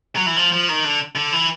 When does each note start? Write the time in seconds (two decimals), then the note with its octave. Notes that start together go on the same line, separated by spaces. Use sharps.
0.16 F#3
0.26 E3
0.36 F3
0.52 F3
0.68 D#3
0.84 D3
1.15 D3
1.33 E3